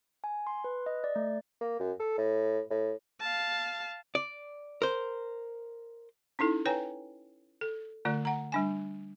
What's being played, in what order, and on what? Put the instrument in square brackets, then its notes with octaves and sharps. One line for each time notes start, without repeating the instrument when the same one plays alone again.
[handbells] G#5
C6
B4
D#5
D5
A3
[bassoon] A#3
F#2
A4
A2
A2
[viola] F5 A5
[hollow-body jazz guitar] D5
A#4 C5
[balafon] C#4 D#4 E4 A4
B4 C#5 G5 G#5 A#5
A4
D3 A3 F4 D5
F#5 A#5
G3 D4 G#5